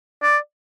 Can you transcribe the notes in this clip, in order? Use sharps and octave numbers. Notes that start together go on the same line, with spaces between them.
D5